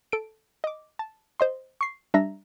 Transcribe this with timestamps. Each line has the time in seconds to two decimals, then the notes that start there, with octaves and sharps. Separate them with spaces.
0.12 A4 D7
0.64 D#5 D6
0.99 A5
1.40 C5 D#5 C6
1.81 C#6 C7
2.14 G3 D4 E5 A#5 A#6